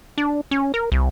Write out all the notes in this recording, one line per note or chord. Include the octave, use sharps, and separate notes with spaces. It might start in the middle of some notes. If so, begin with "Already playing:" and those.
D4
C#4
A#4
C2